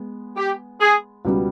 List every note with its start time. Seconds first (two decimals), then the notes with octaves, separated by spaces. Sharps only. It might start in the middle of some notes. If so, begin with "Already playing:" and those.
Already playing: G#3 B3
0.37 G4
0.80 G#4
1.25 C#2 B2 G3 B3